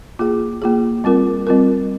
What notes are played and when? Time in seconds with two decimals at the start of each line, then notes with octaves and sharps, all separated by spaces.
0.19 A#3 F4 G#4
0.62 A#3 F4 G#4
1.04 G3 C4 F4 A#4
1.47 G3 C4 F4 A#4